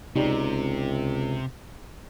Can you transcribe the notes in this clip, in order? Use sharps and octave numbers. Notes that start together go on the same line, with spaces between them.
C#2 C3 D#4 G4 D5